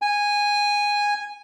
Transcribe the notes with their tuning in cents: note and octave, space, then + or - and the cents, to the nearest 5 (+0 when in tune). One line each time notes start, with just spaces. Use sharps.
G#5 -10